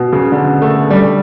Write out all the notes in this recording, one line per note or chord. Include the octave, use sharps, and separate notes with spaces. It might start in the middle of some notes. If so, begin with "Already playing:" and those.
Already playing: B2
C#3
D3
A3
G3